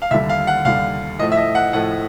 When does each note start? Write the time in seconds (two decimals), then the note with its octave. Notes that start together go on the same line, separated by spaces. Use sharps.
0.02 F5
0.11 D#2 D3 G3 E5
0.29 F5
0.47 F#5
0.65 D#2 D3 G3 F5
1.19 A2 F3 A3 D#5
1.32 E5
1.37 D#5
1.55 F#5
1.73 A2 F3 A3 F#5